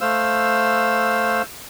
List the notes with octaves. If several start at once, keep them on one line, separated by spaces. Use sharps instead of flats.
A3 C5 F5 E6